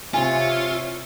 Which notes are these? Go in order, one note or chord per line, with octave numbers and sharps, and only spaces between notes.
C3 F4 C#5 E5 G#5